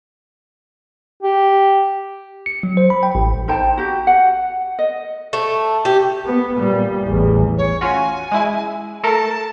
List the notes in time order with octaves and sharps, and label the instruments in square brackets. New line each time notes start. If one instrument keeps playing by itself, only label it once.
[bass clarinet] G4
[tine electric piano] C#7
F#3
C5
B5
G5
A1
[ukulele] D#4 C5 G5 A5
F#4 G4
F#5
D#5
[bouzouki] A3
G4
[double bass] B3
A#2 G3
A1 E2
[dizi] C#5
[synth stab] C#4 F4 F#4 [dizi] G#5
[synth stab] G#3 E4
[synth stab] A3 A4 A#4 [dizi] A5